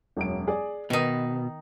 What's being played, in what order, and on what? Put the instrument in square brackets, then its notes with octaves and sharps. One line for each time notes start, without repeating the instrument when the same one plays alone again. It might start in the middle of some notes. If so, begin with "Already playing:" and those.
[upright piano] E1 F#2 D7
G#4 D5
[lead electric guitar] B2 [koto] D#3 D#4 [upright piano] B3